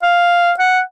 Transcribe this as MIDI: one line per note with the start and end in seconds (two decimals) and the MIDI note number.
0.02 0.52 77
0.59 0.81 78